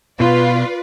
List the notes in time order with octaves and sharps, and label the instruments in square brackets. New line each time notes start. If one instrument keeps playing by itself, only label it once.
[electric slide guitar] B2 [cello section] F4 [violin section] B4 D5